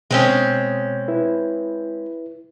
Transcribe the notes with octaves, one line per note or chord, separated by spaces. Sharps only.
B2 G#3 C4 C#4
E4 B4